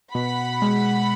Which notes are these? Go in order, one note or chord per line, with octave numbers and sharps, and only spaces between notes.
B2 F#5 B5
G#3